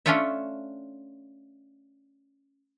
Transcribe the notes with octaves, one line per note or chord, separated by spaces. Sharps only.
A3 C#4 D4 F4 C#5 E5